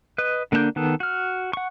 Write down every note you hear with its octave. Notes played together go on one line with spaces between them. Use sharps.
B4 D#5
D3 A#3 D4 A#5 G6
D#3 B3 A4
F#4 F6
F#5 C#6